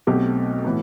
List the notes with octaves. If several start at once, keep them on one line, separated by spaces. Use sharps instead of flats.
B1 B2 A3 C4 G4
A2 E3 B3